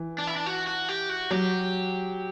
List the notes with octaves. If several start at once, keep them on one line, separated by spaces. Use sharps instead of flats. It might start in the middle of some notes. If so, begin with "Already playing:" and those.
Already playing: E3
D4
E4
D4
F#4
F#4
G4
F#4
F#3 G4